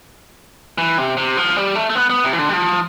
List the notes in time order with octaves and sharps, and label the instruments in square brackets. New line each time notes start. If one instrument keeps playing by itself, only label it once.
[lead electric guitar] E3
C3
C3
F3
G3
A3
A3
B3
B3
C3
E3
D3
G3
F3